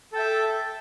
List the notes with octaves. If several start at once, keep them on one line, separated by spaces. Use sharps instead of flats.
A4 E5 G5